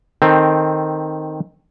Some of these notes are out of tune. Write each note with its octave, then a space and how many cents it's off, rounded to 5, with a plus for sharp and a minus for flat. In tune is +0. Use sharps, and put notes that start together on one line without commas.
D#3 +0 C4 +5 A4 +0